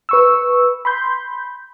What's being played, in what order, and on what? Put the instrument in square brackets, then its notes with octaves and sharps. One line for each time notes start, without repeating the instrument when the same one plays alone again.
[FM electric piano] B4 C#6 E6
B5 C6 G6